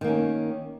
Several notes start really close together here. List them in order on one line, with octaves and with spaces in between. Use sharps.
D#3 A#3 C#4